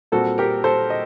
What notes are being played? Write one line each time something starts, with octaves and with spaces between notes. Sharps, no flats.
A#2 G3 C4 F#4 A4
G4 A#4
A4 C5
D#5